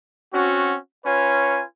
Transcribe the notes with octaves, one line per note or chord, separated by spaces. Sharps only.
C4 C#4 F#4
C#4 F4 B4 C#5 G#5